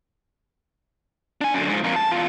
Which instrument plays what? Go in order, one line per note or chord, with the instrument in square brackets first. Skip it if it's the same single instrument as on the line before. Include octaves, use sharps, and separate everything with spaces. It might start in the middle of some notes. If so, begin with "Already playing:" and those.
[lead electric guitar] D4 G#5
F#2 D3
G#2 F3
F2 A#3
A5
E2 F4